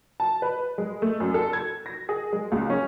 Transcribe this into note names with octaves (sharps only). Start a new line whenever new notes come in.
A5
B4
G#3
A3
F#2
A4
G#6
A#6
G#4
G#3
C#2
C#4